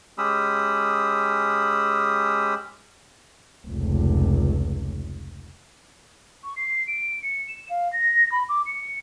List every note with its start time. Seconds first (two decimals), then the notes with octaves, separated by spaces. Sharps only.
0.18 G#3 C#4 G4 B5 D#6 E6
3.68 F1 C#2
6.43 C#6
6.56 C7
6.87 D7
7.22 C#7
7.48 E7
7.69 F5
7.92 A#6
8.31 B5
8.48 D6
8.66 C#7